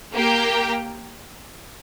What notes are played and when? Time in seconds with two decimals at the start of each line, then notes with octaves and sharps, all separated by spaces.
0.13 A#3 G4 A#4 G5